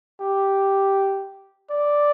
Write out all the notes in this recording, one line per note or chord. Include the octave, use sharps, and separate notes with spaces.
G4
D5